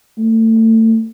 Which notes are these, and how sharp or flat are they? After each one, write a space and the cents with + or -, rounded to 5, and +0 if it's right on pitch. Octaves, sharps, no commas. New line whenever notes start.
A3 +30